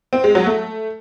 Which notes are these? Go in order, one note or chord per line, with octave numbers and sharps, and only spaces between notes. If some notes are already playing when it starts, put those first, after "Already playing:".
C4
G#3
F#3
A3